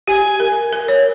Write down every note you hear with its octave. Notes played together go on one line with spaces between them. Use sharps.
G4 G#5
A#4
A#4
C#5